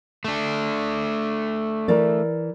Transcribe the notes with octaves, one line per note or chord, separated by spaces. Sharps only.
A3 D4
E3 A#4 D5